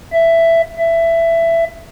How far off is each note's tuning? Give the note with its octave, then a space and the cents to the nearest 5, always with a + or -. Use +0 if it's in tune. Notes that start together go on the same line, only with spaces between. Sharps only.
E5 +10
E5 +15